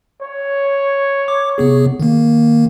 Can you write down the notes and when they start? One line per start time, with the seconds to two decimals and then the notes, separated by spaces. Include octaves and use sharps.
0.21 C#5
1.28 D6
1.58 C3 B3 G#4
2.00 D#3 A#3